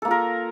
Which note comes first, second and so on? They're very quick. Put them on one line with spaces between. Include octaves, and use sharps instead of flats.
A4 A#3 F4 A#4